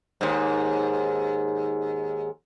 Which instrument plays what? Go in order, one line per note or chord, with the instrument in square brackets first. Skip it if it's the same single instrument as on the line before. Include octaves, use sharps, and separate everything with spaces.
[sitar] D#2 G#2